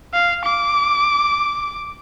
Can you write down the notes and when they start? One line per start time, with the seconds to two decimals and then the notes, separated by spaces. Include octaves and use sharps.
0.14 F5
0.45 D6